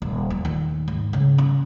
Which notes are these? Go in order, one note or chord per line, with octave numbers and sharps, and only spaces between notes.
D#1
F3
D#2
G#2
C#3
C#4